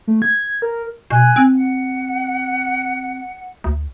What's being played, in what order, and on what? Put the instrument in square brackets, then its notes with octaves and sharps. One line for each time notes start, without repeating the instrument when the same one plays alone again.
[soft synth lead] A3
G#6
A#4
[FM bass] B2 [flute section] G#5 F#6
[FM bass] C4
[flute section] F#5
[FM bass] D2